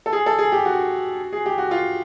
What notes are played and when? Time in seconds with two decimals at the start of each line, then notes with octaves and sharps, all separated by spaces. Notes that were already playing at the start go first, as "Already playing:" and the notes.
0.06 A4
0.13 G#4
0.26 A4
0.39 G#4
0.52 G4
0.65 F#4
1.33 G#4
1.46 G4
1.58 F#4
1.71 F4